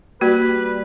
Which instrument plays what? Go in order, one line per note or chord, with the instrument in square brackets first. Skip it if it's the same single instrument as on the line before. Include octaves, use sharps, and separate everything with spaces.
[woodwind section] G3 B4 [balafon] A#3 F#4